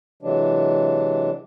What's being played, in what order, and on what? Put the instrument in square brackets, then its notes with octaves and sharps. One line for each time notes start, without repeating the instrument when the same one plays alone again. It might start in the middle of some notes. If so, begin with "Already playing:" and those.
[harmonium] C3 E3 F#3 G#3 D4